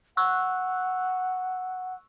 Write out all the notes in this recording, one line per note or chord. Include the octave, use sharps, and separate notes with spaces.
F#5 C#6 E6 F#6